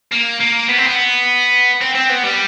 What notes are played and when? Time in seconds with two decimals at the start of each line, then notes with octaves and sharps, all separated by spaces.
0.12 A#3
0.40 A#3
0.69 B3
0.78 C4
0.87 B3
1.81 C4
1.95 C4
2.09 B3
2.23 G3